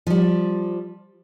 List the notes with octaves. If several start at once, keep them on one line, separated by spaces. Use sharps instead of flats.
F3 G3